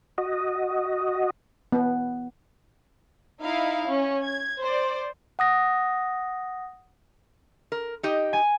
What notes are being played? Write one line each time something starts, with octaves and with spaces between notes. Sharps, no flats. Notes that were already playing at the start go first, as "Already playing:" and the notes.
F#4 D#5
B3
D#4 E4 F5
C#4
G#6
C5 D5
F#5 D#6 A#6
A#4
D#4 G4 D#5
G#5